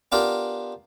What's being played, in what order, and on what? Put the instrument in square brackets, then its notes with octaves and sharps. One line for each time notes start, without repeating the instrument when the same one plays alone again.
[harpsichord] B3 D4 F4 G4 A#4 D5